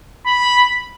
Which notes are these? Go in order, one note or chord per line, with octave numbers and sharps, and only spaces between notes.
B5